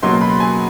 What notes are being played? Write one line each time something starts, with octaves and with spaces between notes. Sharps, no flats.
C#2 B2 F#3 A#3 C6
B5
G#5